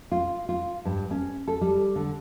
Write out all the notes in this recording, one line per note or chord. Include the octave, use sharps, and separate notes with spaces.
F4
F4
G2
C#4
A4
G3
D3